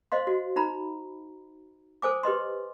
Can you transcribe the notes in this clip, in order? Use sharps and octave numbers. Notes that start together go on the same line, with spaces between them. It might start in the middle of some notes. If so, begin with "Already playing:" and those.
C5 D#5 F5 C6
F#4
D#4 A#5 B5
A4 C5 G#5 D6
G4 B4 D#5 C6